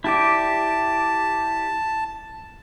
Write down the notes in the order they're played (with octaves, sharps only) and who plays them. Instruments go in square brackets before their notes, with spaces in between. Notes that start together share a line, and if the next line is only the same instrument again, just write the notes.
[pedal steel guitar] E4 G4 D5 [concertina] A5